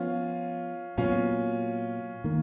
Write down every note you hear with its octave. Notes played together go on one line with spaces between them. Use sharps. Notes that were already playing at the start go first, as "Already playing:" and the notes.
Already playing: F3 B3 C#4 F4
A#2 F#3 B3 C#4 F4
D#3 A#3